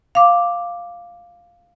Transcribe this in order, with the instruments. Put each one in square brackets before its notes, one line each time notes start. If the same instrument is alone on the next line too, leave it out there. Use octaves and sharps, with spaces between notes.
[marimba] F5 D6